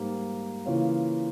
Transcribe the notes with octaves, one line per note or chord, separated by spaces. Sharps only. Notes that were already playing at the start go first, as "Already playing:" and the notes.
Already playing: G#2 G3 A#3
C#3 E3 A#3 C#4 F4